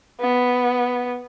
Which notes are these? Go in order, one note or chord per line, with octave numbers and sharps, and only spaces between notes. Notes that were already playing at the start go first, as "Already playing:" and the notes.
B3